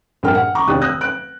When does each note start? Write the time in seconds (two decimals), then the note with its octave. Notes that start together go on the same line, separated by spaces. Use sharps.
0.23 A#1 G2 G#4 A#4 G5 F6
0.35 F#5
0.55 A#5 C#6 D6
0.67 F1 D#2 D4 G4 D#6 F#6
0.82 D#6 E6 F#6 G6 A#6
1.01 F#6 D7